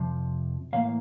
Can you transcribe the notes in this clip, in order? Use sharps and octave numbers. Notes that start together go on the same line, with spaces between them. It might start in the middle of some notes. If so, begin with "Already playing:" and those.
Already playing: F2 C3 F3
A2 E3 A#3 F5